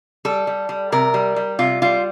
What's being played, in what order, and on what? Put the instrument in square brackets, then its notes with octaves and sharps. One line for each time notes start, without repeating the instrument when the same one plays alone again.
[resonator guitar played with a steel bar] G3 A4
G3
G3
C3 A#4
G3
G3
C3 F4
G3 F4